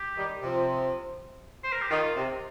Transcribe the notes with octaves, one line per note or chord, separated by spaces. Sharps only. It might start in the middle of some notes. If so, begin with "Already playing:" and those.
Already playing: G4
D#3 G3
C3 F3
C5
A#4
G4
D#3 F4
C3